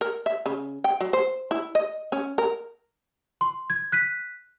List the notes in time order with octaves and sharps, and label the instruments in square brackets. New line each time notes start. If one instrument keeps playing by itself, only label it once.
[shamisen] A#4
E5
C#3
G5
F#3
C5
E4
D#5
C#4
A#4
[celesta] C6
G#6
F#6 B6 D#7